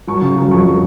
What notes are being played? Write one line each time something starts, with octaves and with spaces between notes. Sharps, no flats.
F#3 C#6
C#3
F#3
F2 C#6